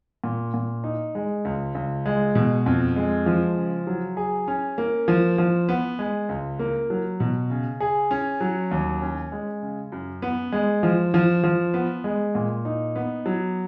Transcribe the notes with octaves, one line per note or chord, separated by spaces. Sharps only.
A#2
A#2
D#4
G#3
C#2
C#2
G#3
B2
F2
G#3
F3
C#3
F#3
G#4
C#4
A#3
F3
F3
B3
G#3
C#2
A#3
F#3
B2
C#3
G#4
C#4
F#3
D#2
C#4
G#3
C#3
F#2
B3
G#3
F3
F3
F3
B3
G#3
A#2
D#4
B3
F#3